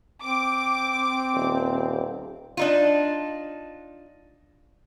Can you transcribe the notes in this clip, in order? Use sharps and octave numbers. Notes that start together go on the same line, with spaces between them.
C4 D6
D#1
D4 D#4 F4